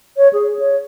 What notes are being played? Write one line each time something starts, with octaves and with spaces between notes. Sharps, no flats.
C#5
G#4
C#5